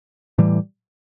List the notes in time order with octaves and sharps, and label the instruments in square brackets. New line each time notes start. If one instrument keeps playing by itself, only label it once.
[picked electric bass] A2 E3 G3